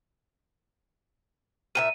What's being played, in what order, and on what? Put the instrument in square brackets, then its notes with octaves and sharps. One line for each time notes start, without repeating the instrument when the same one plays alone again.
[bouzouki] A#2 G4 E5 [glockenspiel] D#7